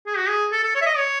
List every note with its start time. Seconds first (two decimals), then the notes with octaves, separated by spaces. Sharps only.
0.07 G#4
0.18 F#4
0.28 G#4
0.52 A4
0.63 A4
0.75 C#5
0.82 E5
0.86 D#5
0.97 C#5